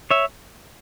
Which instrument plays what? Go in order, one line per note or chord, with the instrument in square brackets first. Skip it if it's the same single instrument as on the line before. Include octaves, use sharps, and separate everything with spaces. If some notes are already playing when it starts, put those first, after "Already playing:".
[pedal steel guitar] C#5 E5